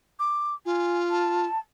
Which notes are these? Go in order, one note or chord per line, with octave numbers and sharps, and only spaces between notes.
D6
F4 G#5
A5